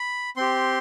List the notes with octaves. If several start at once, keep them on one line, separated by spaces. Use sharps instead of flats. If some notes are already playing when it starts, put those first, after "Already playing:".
Already playing: B5
C4 G4 C6